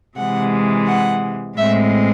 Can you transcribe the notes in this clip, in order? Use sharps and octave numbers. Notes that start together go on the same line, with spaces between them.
C3 E3 G#3 F#5
F#5
A2 G#3 C4 E5